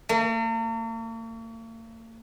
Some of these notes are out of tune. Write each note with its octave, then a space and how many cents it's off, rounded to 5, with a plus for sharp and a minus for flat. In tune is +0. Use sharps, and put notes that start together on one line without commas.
A#3 -45